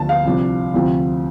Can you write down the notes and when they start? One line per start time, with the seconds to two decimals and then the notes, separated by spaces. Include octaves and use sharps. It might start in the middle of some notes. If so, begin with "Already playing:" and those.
Already playing: D2 D3 F3 A5
0.09 F5
0.25 C2 C3 F3 D4
0.74 D2 C3 F3 C4